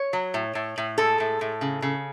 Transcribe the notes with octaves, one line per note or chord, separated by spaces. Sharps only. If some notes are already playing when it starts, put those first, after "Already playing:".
Already playing: C#5
F#3
A2
A2
A2
G#3 A4
A2
A2
C#3
C#3